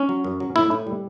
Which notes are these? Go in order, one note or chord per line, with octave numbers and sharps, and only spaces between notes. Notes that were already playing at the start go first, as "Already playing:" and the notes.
Already playing: C#4
F#3
F#2
F#3
A2 E4
A2
G3